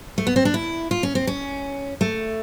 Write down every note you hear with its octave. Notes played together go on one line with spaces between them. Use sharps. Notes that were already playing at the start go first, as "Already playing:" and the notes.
A3
B3
C4
D4
E4
F4
C#4
C4
C#4
A3